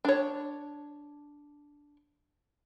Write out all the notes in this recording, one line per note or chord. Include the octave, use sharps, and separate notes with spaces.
D4 C#5